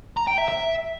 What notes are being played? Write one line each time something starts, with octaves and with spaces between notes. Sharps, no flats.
A#5
G5
E5
E5